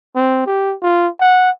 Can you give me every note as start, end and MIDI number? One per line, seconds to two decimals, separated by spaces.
0.16 0.45 60
0.46 0.75 67
0.82 1.08 65
1.20 1.50 78